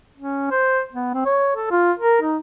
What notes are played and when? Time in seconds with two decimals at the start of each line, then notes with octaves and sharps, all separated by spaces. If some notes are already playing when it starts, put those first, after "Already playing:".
0.16 C#4
0.51 C5
0.93 B3
1.14 C4
1.26 C#5
1.56 A4
1.71 F4
1.99 A#4
2.21 D#4